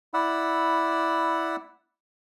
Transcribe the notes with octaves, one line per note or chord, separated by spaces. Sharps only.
E4 D5 F#5 B5 E6